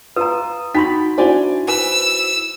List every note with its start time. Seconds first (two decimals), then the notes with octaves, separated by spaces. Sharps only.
0.16 F4 B4 A#5 D#6
0.75 D#4 F#4 G5 B5 C6 B6
1.18 D4 E4 F#4 C5 D5 G#5
1.68 B4 G#5 E6